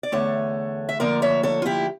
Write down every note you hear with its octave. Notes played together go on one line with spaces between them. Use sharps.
D5
E2 D3 A3 A4 C#5
E5
D2 D3 F3 A#3 A#4 D5
C#5 E5
A4 C#5
F4
E4 G4